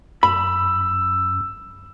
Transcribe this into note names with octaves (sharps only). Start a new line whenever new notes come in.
F#2 B5 E6